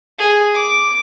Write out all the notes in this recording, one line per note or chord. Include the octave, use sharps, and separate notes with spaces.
G#4
D6